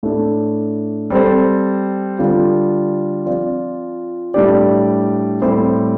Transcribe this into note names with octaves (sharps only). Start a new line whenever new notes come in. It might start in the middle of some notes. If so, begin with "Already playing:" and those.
A2 A3 D4
G3 C4 A4 C5
D3 G3 D4 F4
F3 C4 F4 D5
A2 G3 D4 G4 D5
A2 G3 C4 G4 C5